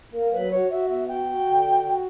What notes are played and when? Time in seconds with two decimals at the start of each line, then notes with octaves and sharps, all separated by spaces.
0.13 A#3 A#4
0.32 F#3 B4
0.50 F#4 C#5
0.70 F#4 E5
0.89 B3 E5
1.08 F#4 G5
1.26 F#4
1.45 D3
1.64 F#4
1.83 F#4